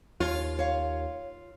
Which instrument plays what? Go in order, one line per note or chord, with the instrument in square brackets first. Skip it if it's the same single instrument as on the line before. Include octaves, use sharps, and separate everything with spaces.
[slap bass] D#2 [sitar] F4 [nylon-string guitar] C#5
[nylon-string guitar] C#5 F5